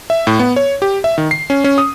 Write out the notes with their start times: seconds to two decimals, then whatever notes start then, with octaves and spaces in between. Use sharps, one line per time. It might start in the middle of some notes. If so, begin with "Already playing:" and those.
0.10 E5
0.27 A2
0.39 B3
0.56 C#5
0.82 G4
1.04 E5
1.18 D#3
1.31 C7
1.50 C#4
1.64 C#4
1.78 D#6